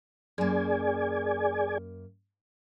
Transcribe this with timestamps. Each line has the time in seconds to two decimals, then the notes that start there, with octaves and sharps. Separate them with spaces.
0.38 F#2 A#3 G#4 D5 G#5